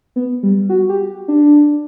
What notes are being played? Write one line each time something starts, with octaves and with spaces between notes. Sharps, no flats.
B3
G3
F#4
G4
D4